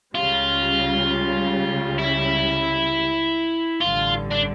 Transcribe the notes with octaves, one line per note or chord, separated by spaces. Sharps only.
C#2 C#3 G3 F4
E4
A1 G2 D3 F4
D4